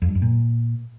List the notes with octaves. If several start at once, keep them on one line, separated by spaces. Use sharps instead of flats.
F2
G2
F#2
A#2